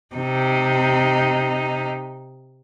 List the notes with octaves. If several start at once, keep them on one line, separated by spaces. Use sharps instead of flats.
C3 D#4